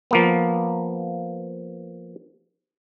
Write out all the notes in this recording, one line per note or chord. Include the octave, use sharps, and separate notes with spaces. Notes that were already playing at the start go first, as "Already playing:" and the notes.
F3 A#3 B3